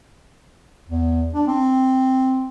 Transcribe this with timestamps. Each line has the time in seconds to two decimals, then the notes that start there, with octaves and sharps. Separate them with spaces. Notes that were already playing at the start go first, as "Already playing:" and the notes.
0.89 E2
1.34 D4
1.47 C4